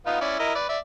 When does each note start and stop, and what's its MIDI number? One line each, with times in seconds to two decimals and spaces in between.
0.06 0.20 59
0.06 0.20 63
0.06 0.20 65
0.21 0.37 61
0.21 0.37 64
0.21 0.37 74
0.39 0.54 64
0.39 0.54 70
0.39 0.54 75
0.55 0.64 71
0.55 0.64 74
0.69 0.78 74
0.69 0.78 76